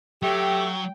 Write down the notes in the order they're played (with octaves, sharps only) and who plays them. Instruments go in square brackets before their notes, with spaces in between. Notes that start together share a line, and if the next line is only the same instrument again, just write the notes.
[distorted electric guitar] F#3 [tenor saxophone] A3 [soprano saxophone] G4 [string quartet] G5